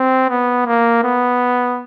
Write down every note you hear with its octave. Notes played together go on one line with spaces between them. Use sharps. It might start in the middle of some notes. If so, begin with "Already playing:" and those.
Already playing: C4
B3
A#3
B3